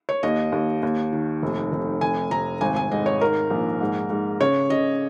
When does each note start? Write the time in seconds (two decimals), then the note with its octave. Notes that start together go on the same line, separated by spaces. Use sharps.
0.09 C#5
0.23 D#2 D#5
0.52 D#2
0.83 D#2
1.13 D#3
1.42 F1
1.72 F1
2.01 F1 G#5
2.31 F1 A#5
2.61 G#1 G#5
2.76 G#5
2.91 G#2 D#5
3.06 C#5
3.21 D#3 A#4
3.50 A#1
3.81 G#2
4.10 G#2
4.40 C#3 C#5
4.70 C#3 D#5